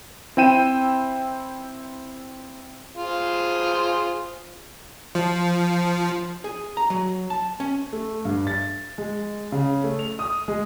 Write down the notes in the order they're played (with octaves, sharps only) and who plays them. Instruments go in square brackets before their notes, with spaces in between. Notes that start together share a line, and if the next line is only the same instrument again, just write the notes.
[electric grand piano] C4 E4 G5 D#7 E7
[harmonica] F4 G#4 C5
[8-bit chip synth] F3
[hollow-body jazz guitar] G#4
A#5
F#3
A5
C#4
[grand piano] A3
G2
A6
G#3
C#3
A3
F7
D#6
G#3